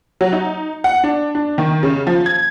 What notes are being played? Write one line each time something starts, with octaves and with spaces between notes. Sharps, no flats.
F#3
D#4
F#5
D4
D4
D#3
C#3
F3
G#6